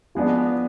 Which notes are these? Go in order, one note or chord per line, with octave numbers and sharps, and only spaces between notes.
F3 G#3 B3 D4